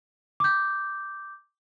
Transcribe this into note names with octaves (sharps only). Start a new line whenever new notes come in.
D6 G6